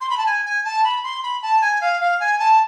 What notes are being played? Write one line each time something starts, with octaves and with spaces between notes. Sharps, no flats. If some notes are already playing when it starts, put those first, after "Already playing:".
C6
B5
A5
G#5
G#5
A5
B5
C6
B5
A5
G#5
F5
F5
G#5
A5